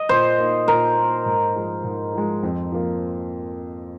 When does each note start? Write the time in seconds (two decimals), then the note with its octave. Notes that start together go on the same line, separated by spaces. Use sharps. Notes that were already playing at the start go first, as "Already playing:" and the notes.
Already playing: D#5
0.09 A#2 C5
0.38 A#3 D#4
0.68 A#2 A#4
0.97 A#3 D#4
1.26 G#2
1.56 F3 G#3
1.84 G#2
2.14 F3 G#3
2.43 F2
2.72 F3 A#3 F4